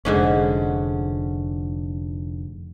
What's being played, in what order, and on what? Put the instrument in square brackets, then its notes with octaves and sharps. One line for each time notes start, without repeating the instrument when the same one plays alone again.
[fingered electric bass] F1 [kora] G#2 D3 C#4